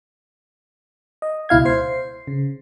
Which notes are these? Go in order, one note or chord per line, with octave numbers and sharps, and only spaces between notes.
D#5
C#2 B2 E4 F5 G#6
C5 C7
C#3